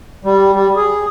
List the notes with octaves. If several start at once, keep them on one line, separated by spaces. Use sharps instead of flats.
G3
G3
G#4